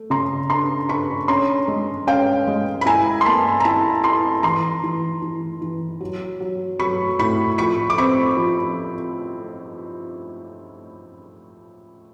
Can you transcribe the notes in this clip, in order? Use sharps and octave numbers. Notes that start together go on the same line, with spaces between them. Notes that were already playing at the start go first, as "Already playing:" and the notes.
Already playing: A3
C#3 A#5 C6
D4 A#5 C6
D4 B5 C#6
C#4 A#5 C6
G#3
C#4 F5 G5
G#3
B5
E4 G#5 A#5
C6
A#3 A5 B5
A#5
E4 A5 B5
E4 A#5 C6
E3 A#5 C6
E3
E3
E3
F#3
F#3
F#3 B5 C#6
A2 B5 C#6
F3 B5 C#6
D6
C4 B5 C#6
F3